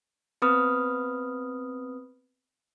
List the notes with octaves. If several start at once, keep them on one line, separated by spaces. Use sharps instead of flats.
B3 C4 B4 B5 D#6 F6